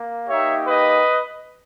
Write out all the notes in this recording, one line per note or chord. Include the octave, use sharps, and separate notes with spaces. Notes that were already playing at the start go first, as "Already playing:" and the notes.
Already playing: A#3
A#3 D#4 G4 C#5 E5
B4 D#5